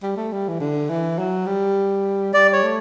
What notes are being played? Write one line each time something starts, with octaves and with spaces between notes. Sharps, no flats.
G3
A3
G3
E3
D3
E3
F#3
G3
G3 D5
C#5
A3